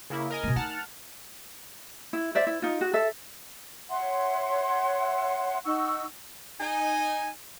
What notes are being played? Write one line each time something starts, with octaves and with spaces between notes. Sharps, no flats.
C#3 A#3 E4
A#4 D#5 G#5
B2 A#3
D#4 F#5 A5 F6
E4
C5 D5 E5
E4
D#4 F4
F#4
A4 E5
C#5 E5 F#5 C6
D#4 F#5 C#6 E6
D#4 G#5